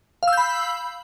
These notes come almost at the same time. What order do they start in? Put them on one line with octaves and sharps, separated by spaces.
F5 E6 G6 B5